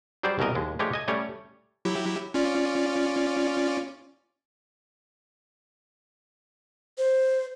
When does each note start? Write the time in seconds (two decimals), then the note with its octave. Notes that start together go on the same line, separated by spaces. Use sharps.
0.23 F#3 G3 G#4 C5 D5
0.39 C2 B2 E3 A#4 D#5
0.55 D#2 G#3
0.79 F3 G#3 A3 D4 G4 C#5
0.93 D#5 G#5
1.08 G3 A3 C#4 C#5 D5
1.85 F#3 E4 G4
2.34 C#4 F4 D5
6.98 C5